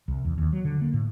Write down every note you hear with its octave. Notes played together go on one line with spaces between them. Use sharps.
C2
E2
D#2
F#3
D3
A#3
A2